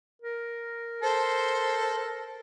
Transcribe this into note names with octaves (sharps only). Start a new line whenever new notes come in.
A#4
A4 C5